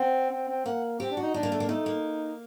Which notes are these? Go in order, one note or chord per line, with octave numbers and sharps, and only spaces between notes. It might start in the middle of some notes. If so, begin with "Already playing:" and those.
Already playing: C4 F#5
C4
C4
A#3 F#5
C4 G4
D4
F#4
D#4
D4 D#4
A#3
A3
A#3
A3 D#4
A#3